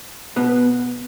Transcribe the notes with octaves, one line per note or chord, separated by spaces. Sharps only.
B2 B3